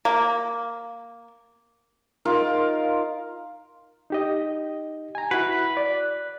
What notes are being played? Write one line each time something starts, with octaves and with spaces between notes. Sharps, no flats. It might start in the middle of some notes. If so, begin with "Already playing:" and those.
A#3
D#4 F4 A#4
D#4 G4 D#5
G#5 A#5
E4 F#4 B4
D5